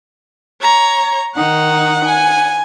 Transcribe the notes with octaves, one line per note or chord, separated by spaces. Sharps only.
C#5 A#5
D#3 D#4 F#5
G#5